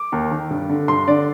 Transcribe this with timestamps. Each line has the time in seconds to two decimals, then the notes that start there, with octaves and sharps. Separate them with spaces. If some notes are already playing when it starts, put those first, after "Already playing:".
Already playing: D6
0.12 D#2
0.31 D#3
0.51 G2
0.70 D3
0.88 G2 C6
1.07 D3 D5